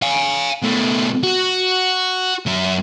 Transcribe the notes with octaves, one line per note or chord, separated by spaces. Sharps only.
F5 G#5
B2 A3
F#4
F#2 E5